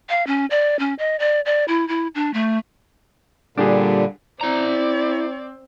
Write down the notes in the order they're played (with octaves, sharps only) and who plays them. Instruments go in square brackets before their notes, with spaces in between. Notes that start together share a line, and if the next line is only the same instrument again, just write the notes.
[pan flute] F5
C#4
D5
C#4
D#5
D5
D5
E4
E4
D4
A3
[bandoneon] A#2 D3 [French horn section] G3 [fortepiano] D4 G4 G#4
[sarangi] C4 [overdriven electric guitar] E4 A#5 [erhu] D5